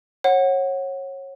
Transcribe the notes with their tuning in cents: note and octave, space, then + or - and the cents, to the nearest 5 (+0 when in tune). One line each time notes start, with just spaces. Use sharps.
C#5 -25 F#5 +0